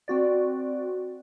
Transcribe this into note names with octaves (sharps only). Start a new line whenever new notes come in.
C4 F#4 D5